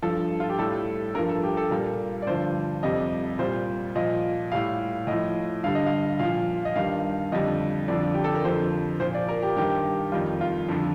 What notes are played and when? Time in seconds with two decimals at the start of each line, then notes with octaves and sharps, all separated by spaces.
0.02 G2 F3 A4
0.40 F4
0.49 G4
0.58 A2 G3 A4
1.15 G2 F3 A#4
1.29 A4
1.43 G4
1.57 A4
1.71 A#2 G3 A#4
2.22 D5
2.27 G2 D3 F3 C5
2.83 F2 C3 G3 D#5
3.39 A#2 G3 C5
3.96 A#2 F3 D#5
4.52 A2 G3 F5
5.07 A2 F3 D#5
5.64 G2 D3 G3 F5
5.75 D#5
5.86 F5
6.19 A#2 F3 F5
6.65 D#5
6.76 G2 D#3 G3 F5
7.32 F2 D3 G3 D#5
7.88 F2 D3 F3 D5
8.14 G4
8.24 A4
8.34 A#4
8.44 F2 D3 F3 C5
9.00 A#2 F3 C5
9.14 D5
9.28 A#4
9.42 G4
9.56 G2 D#3 G3 G4
10.12 F2 D#3 G3 F4
10.41 F4
10.69 F2 D3 F3